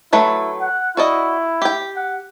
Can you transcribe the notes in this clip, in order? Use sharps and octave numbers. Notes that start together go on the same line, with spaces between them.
F#3 A3 E4 B4
F#5
E4 F#4 D5 D#5
G4 G5
F#5